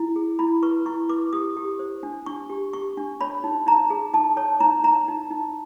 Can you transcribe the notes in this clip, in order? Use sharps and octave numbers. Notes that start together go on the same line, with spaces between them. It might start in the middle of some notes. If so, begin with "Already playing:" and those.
Already playing: E4
G#4
E4 B5
B4 C#6
E4 C#6
B4 D6
G4 D#6
G4
C5
D4
D4 C#6
G4
G4 C#6
D4
C#5 B5
D#4
D#4 A#5
G#4
D#4 A5
C#5 A5
D#4 A#5
D#4 A#5
D#4
D#4